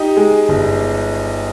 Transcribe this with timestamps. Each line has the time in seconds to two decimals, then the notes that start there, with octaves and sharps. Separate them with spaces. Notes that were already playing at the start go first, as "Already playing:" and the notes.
Already playing: D#4 G4
0.17 G#3
0.49 G1